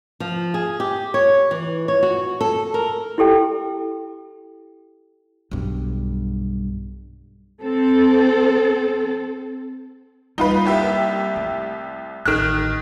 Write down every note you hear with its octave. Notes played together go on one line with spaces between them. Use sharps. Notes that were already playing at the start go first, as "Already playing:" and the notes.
F3
G#4
G4
C#5
E3
C#5
F#4
A4
A#4
E4 G4 A4 G5
B1 G2
C4 A4
G3 A#3 D#4 F4 B4
C2 G4 E5
A3
A1 D#3 F6 F#6